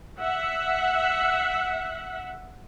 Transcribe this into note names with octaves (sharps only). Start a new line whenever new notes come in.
E5 F#5